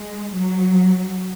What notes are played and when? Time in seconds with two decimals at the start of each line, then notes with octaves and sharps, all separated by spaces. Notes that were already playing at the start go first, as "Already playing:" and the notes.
Already playing: G#3
0.35 F#3